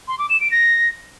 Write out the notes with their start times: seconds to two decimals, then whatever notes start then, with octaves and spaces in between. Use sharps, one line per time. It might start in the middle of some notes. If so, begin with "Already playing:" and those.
0.08 C6
0.19 D6
0.30 E7
0.41 D7
0.51 A#6